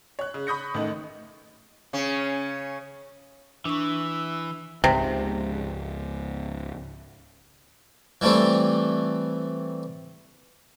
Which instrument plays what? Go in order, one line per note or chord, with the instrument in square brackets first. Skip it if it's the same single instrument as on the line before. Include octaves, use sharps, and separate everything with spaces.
[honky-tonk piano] C#5 F#6
C#3
B5 C#6 D#6 G6 A#6 C#7
A1 D#3 A3 D#5 F#7
[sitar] C#3 C#4
[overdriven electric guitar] E3 [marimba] D4 C#6 [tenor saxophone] E5
[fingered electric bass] C#2 G#2 [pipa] C3
[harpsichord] E3 G3 A3 C4 E4